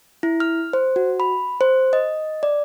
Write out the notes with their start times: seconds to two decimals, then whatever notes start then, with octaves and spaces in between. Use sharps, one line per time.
0.23 E4
0.40 F6
0.73 C5
0.96 F#4
1.20 B5
1.61 C5
1.93 D#5
2.43 D5